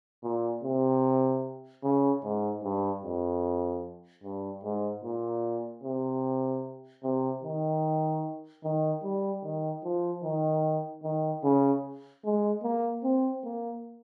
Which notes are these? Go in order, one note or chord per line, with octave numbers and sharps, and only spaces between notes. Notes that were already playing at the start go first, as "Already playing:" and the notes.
A#2
C3
C#3
G#2
G2
F2
G2
G#2
A#2
C3
C3
D#3
D#3
G3
D#3
F3
D#3
D#3
C#3
G#3
A#3
C4
A#3